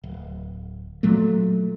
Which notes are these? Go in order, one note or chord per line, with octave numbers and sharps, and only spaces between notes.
D1
A#2 F#3 A3